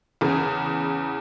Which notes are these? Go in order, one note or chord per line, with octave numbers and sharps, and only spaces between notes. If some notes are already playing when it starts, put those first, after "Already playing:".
E2 C#3